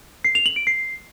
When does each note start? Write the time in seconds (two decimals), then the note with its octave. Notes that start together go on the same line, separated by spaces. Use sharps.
0.24 C7
0.35 F7
0.46 F#7
0.56 D7
0.67 C7